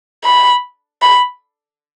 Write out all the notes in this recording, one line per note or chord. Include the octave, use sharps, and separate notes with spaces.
B5
B5